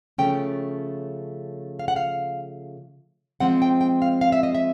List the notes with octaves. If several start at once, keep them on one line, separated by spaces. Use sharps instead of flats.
C#3 F3 A3 C#4 G5
F5
F#5
F5
F3 G#3 C4 F#5
G5
G5
F5
F5
E5
D#5
E5